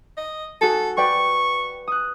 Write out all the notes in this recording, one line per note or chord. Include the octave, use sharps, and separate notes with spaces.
D#5
F#4 G#4 A4
B4 D5 G5 C#6
D#6 F#6